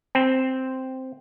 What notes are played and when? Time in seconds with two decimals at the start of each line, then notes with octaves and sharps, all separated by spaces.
0.15 C4